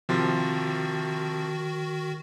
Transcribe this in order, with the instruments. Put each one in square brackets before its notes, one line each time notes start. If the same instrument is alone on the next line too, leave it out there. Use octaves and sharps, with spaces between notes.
[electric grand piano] C3 F3 C6 [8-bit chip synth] D#3 F#4